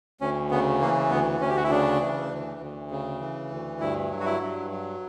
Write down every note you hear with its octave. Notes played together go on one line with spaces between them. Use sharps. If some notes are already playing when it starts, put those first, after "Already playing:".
D2 C#4
C#3 B3
E3 A#3
D2 B3
D2 C#4
G4
F#4
E4
C#3 D4
E3
D2
D2
C#3
E3
D2
G2 E4
F#3
F#4
E4
G2
F#3